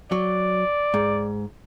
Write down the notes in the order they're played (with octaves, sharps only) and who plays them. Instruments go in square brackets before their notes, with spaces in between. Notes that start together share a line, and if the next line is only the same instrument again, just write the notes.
[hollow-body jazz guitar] F#3 [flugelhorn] D5
[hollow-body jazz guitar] G#2